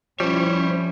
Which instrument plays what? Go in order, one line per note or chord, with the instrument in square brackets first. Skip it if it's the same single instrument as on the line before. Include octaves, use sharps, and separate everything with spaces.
[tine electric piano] F3 [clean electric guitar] G3 [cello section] C#4 E4 [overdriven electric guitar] C5 C#5